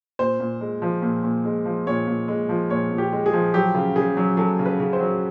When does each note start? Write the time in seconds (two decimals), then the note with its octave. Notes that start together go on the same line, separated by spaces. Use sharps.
0.19 A#2 C5
0.40 A#2
0.61 G#3
0.82 F3
1.02 A#2
1.24 A#2
1.45 G#3
1.65 F3
1.87 A#2 C#5
2.07 A#2
2.28 G#3
2.49 F3
2.70 A#2 C#5
2.91 A#2
2.98 G4
3.12 G#3
3.26 G#4
3.33 F3
3.54 F#3 G4
3.75 C#3
3.96 C#3 G#4
4.17 F#3
4.37 F#3 A4
4.59 C#3
4.66 B4
4.80 C#3
4.93 C5
5.00 F#3